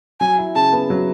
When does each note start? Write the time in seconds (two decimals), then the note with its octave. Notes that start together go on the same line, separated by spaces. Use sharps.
0.20 F#3 G#5
0.38 E4
0.55 C#3 A5
0.73 B3
0.90 F#3